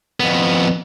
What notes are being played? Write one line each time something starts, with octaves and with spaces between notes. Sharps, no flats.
F2 B3